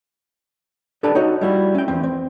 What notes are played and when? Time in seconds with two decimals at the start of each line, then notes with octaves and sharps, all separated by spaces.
1.03 D4 G4 A4 B4 D5 A5
1.15 D#4 F#4 C#5 D#5
1.41 G3 E4 F#4
1.75 C#4 G5
1.88 E2 C4
2.03 C4